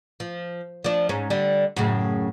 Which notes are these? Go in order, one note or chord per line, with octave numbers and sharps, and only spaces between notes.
F3
F3 D4
G#2 C#4
D3 G3
F#2 A2 C#3